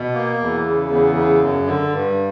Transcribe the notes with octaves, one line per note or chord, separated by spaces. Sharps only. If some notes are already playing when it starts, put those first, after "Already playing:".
Already playing: B2
A#3
E2
C#3
E2
C#3
F#2
D3
G2